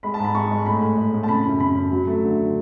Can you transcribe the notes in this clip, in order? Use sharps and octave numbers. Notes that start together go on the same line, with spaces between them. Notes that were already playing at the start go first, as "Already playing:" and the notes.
G#3 B5
A5
G#2
B5
G#3 C#6
G#3
A2 B5
A2
G#3
A2
A5
C#3 B5
F#2
C#3 B5
F#2
F#3
A3
D3
D3